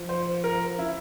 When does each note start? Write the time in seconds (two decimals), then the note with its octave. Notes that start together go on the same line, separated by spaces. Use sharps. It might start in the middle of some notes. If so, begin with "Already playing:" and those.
Already playing: F3
0.09 C5
0.44 A#4
0.79 E4